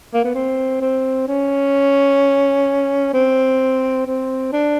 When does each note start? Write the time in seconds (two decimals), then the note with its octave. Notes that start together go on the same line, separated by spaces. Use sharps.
0.14 A#3
0.24 B3
0.35 C4
0.81 C4
1.28 C#4
3.13 C4
4.06 C4
4.53 D4